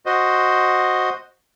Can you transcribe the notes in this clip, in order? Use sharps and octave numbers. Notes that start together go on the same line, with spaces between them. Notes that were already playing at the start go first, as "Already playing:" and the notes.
F#4 C5 D#5